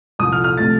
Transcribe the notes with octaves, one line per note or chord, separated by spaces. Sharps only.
C2 A#2 F3 D#6
F6
F6
C3 F3 A3 A6